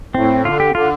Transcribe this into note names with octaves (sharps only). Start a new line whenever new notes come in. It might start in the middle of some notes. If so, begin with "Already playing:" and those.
A2 C4
D3 F4
G4
D3 F4